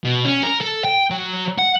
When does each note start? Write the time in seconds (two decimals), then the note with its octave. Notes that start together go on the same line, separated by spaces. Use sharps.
0.04 B2
0.25 C#4
0.44 A#4
0.61 A4
0.85 G5
1.10 F#3
1.58 F#5